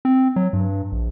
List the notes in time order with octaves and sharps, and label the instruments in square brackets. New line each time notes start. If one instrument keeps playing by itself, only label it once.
[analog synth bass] C4
F#3
G2
A#1